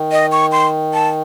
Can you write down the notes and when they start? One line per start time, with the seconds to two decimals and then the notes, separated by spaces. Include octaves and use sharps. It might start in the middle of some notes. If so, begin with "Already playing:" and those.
Already playing: D#3
0.12 D#5
0.32 C#6
0.52 C6
0.93 A5